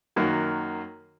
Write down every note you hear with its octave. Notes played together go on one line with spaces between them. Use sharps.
F#2 D#3 A#3 F#4